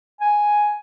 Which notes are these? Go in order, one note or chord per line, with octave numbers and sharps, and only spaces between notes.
G#5